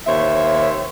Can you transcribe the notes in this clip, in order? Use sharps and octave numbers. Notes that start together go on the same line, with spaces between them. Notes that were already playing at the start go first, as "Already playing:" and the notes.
D#2 C5 C#5 E5